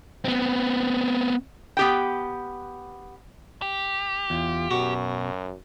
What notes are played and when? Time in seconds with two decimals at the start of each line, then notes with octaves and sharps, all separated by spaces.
0.25 B3 C4
1.77 B3 G4 G5
3.62 G4
4.30 E2 F4
4.71 F#2 B2 F#4